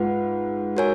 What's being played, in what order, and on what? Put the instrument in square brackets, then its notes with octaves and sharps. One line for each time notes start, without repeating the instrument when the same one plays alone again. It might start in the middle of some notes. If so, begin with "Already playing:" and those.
Already playing: [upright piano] G#2 [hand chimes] F4 B4 F#5
[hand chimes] F#4 A#4 C#5 G#5